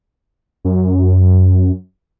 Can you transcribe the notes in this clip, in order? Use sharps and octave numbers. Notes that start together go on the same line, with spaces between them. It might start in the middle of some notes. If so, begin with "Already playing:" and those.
F#2